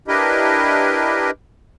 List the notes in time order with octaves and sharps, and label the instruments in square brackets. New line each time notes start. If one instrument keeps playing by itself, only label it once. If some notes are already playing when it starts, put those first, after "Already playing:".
[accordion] D4 E4 G4 A#4 B4 D#5